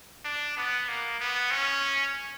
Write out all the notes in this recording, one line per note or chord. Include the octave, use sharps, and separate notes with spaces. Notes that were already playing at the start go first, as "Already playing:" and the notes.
D4
B3
A#3
B3
C#4